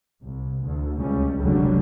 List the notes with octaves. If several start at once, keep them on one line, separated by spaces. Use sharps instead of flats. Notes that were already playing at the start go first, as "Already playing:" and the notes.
C2
D2
C#2 G3 C#4
F1 C#2 D3 F#3 G3